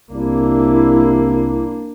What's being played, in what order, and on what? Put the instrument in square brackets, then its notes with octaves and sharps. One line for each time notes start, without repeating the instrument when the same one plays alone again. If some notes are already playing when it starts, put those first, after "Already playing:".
[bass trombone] C2 [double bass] A#3 D4 [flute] E4